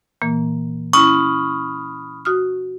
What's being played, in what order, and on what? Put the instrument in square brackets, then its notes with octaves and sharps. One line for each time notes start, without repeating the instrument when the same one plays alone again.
[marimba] A#2 E3 A#3
[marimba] C#4 E4 [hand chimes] B5 D#6 F6 [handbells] C#6
[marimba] F#4 D#6 F6